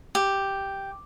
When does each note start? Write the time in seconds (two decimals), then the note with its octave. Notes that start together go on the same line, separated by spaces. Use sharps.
0.15 G4